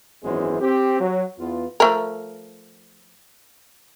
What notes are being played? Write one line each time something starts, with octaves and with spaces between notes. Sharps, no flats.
G#1 F#2 E3 G#3 B3 C5
C4 G4
F#3
E2 B3 F4
F3 A3 A#4